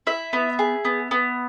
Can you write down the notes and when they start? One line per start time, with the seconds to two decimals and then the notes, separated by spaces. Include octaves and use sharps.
0.07 E4 E5
0.33 B3
0.59 G#4
0.85 B3
1.11 B3